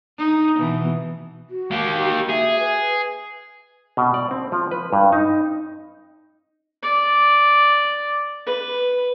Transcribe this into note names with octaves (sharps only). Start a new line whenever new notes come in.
D#4
B2 E3
F#4
A#3 G4
G#4 E5
B4
B2
D5
C4
F3
B4
G2
D#4
D5
B4